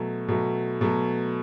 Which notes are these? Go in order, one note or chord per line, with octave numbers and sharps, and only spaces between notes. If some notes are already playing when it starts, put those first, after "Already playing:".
Already playing: B2 F#3 A3
B2 F#3 A3
B2 F#3 A3